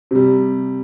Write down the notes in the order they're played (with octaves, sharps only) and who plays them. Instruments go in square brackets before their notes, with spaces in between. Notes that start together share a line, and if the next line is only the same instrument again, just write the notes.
[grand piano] C3 G3